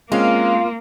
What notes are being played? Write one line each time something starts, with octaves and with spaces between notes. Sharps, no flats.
G#3 A#3 C4 C#4 F4 F5